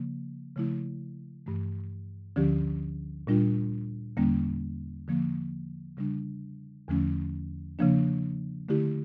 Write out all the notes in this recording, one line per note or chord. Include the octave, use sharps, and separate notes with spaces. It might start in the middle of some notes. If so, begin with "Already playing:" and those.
Already playing: C#3 F3 A#3
C#3 F3 A3 E4
G2 E3 A3
D2 D3 F3 C#4 G4
A#2 G3 D4 F4
E2 D3 G3 A#3 C#4
D3 F3 A#3
C#3 G3 D4
E2 D3 F3 A3 C#4
C#3 F3 A#3 D4
D3 A3 E4 G4